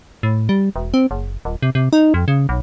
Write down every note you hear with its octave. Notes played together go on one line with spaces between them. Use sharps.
A2
G3
E1
C4
F#1
D#1
C3
C3
D#4
F2
C#3
B1